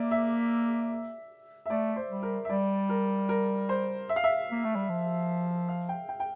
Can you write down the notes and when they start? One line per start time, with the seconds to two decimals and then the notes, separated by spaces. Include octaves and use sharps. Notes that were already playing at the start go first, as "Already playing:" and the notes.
Already playing: A#3 D5 E5
0.11 E5
1.66 E5
1.70 A3 D5
1.96 C5
2.10 G3
2.23 A#4
2.45 E5
2.49 G3 D5
2.89 A#4
3.29 A#4
3.69 C5
4.09 E5
4.16 F5
4.24 E5
4.51 A#3
4.64 A3
4.76 G3
4.89 F3
5.69 F5
5.89 G5
6.09 G5
6.20 G5